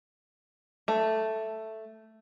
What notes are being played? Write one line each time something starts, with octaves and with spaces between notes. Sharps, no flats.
A3